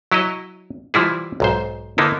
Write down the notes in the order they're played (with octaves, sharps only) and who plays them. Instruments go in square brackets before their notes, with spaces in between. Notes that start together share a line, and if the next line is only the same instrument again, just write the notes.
[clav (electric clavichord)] F#3 E4 C#5 D#5
E3 F3 G3 E4 G#4
B1 G#2 C5
D3 A#3 B3 D#4 E4